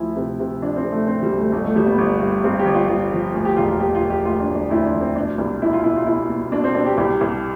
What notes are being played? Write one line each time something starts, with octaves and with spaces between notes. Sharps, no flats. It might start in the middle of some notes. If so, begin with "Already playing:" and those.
Already playing: D2 F3 E4
C3
C3
F3 D4
C4
C3
A3
F3 C4
G3
D2
A3
G1 A3
A3
G1 G3
B3
G1
G2
G2 C4
G4
G1
F4
G1 F4
F3
D2
G4
E1 F4
F4
E1 G4
F4
E1
G4
D2 F4
D4
D2
D4
D2 E4
D4
F3
C4
B2 D4
C2
B2 E4
F4
B2 E4
F4
B2 E4
B2
B2 D4
C4
B2 D4
G4
C2 G4
C2